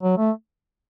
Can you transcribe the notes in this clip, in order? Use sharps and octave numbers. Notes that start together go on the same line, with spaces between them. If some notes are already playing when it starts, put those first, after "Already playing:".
F#3
A3